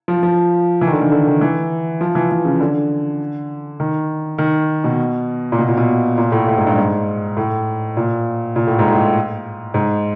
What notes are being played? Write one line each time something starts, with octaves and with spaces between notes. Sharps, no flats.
F3
F3
E3
D#3
D3
D#3
D3
D#3
E3
F3
E3
E3
C#3
D3
D#3
D#3
B2
A#2
B2
A#2
B2
A#2
A2
A2
G#2
G2
G#2
A2
A#2
A#2
A2
G#2
A2
G#2